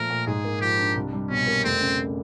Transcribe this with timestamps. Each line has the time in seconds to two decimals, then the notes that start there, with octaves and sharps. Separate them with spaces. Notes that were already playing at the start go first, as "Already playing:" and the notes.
Already playing: A#2 F3 A3 A#4
0.10 A#2
0.27 G#2 G#4
0.44 A#3
0.61 F3 G4
0.79 D4
0.96 C2
1.13 G3
1.30 B2 C#4
1.47 A#3
1.64 F1 C4
1.81 C#3